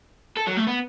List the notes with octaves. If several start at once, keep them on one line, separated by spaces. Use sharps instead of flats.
A4
F#3
A3
B3